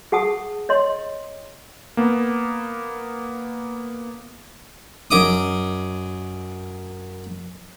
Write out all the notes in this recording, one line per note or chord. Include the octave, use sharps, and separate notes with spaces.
G#4 F#5 A5 D#6
C#5 D#5 C6
A#3 B3
F#2 D#5 D6 D#6